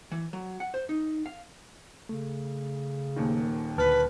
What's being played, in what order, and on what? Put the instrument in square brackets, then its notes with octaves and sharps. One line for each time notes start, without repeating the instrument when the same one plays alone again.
[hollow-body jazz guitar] E3
F#3
F#5
C5
D#4
F5
[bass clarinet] C#3 [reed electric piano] A3
[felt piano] D#1 D#2 D#3
[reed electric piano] D2 A5 F6 [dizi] B4